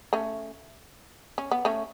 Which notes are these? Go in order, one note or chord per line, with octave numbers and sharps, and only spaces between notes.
A3 C#4
C#4
B3
A3 C#4